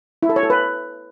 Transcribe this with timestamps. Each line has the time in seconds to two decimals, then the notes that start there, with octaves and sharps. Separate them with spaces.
0.23 E4
0.29 A4
0.36 C#5
0.43 A4
0.50 B4